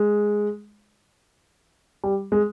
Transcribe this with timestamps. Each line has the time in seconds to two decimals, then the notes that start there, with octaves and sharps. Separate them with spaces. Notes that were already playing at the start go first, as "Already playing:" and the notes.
Already playing: G#3
2.04 G3
2.32 G#3